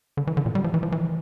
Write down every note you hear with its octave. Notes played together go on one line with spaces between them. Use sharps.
D3
E3
D3
A#2
G3
F3
E3
F3
E3